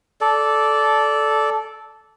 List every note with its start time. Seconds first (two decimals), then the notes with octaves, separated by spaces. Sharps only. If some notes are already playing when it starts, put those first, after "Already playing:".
0.21 A4 D5